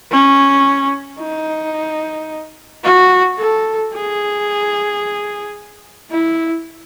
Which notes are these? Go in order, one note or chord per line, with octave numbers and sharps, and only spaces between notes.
C#4
D#4
F#4
A4
G#4
E4